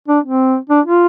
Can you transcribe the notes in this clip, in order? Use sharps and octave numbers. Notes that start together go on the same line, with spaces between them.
D4
C4
D4
F4